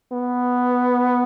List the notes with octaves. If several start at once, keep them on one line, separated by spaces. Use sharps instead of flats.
B3